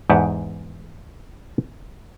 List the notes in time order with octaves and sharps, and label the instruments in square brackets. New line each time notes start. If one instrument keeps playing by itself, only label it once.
[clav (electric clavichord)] E2 G#2 G4 F#5 G#5 A5